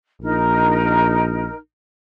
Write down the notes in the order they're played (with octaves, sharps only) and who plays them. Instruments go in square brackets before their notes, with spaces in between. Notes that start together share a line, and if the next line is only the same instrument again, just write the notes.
[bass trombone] A#1 [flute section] D#4 A#4